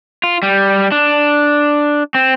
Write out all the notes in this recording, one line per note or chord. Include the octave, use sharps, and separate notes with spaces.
F4
G3
D4
C4